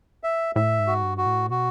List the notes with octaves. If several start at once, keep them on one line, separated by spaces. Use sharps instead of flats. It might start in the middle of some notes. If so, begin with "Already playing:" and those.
E5
A2 E5
G#2
F#4
G2
F#4
A2
B2 F#4